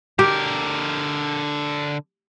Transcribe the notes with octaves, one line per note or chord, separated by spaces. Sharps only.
D3 G4 A#4